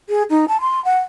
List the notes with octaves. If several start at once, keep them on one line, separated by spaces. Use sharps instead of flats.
G#4
D#4
A5
C6
F#5